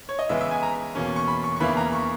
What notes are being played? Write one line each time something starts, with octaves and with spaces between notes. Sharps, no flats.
C#5
D#5
C#3 E3 G#3 B3 E5
E5
G#5
A#5
E2 B2 A#3 C#4
C#6
B5
C#6
C#6
E2 C#3 E3 A#3 E4 B5
A#5
C#6